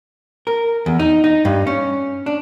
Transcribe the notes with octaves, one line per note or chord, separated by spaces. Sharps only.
A#4
E2
D#4
D#4
G2
C#4
D4